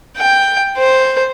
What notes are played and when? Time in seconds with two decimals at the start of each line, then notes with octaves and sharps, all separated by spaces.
0.17 G5
0.77 C5